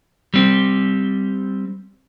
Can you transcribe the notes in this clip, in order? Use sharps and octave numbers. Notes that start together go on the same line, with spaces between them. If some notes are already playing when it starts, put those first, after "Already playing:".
G3 C4